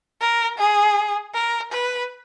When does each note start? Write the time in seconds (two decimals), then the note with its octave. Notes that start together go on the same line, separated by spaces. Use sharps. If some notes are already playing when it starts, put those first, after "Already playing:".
0.21 A#4
0.58 G#4
1.34 A#4
1.72 B4